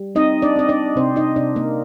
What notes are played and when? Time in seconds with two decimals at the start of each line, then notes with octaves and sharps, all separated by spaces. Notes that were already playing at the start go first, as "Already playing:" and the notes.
Already playing: G3
0.15 C4 D#4 D#5
0.42 D4 D5
0.56 C4 D#5
0.69 D4 D5
0.96 C3 C4 C5
1.16 D#4 D#5
1.36 C3 D4 D5
1.56 A#3 A#4